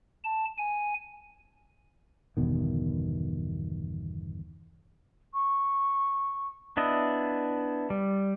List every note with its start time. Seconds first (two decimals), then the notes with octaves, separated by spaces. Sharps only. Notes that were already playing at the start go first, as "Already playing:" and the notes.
0.24 A5
0.58 G#5
2.37 G1 E2 B2 D#3
5.34 C#6
6.77 B3 D4 E4 D#5
7.90 G3